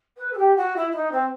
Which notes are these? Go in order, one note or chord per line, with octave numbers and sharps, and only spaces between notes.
B4
A4
G4
F#4
E4
E4
D#4
C4